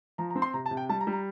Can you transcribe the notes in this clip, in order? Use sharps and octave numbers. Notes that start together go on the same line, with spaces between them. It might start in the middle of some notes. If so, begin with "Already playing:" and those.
F3 A#5
A#5
C4
C6
C3 A#5
A5
C3
G5
G3 A5
A#5
G3
A#5